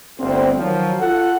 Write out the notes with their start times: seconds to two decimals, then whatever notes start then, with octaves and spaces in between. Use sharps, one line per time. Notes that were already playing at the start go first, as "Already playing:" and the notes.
0.19 G1 D2 G3 C4
0.58 D#3 F3 F#3
0.99 F4 A4 F#5